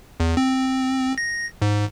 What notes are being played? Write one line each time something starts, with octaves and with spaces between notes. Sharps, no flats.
E2
C4
A#6
G#2